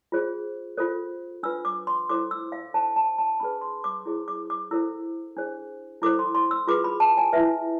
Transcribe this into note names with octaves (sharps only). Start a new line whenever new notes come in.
F4 G#4 C5
F4 A4 C5
D4 F4 B4 E6
D6
C6
E4 A4 C5 D6
E6
F5
D4 A4 C5 A5
A5
A5
D4 G#4 B4 B5
C6
D6
E4 G#4 C5
D6
D6
E4 A4 C5 E6
D4 G#4 C5
E4 A4 C5 D6
C6
C6
E6
F4 G#4 B4 D6
B5
A5
G#5
E4 B4 E5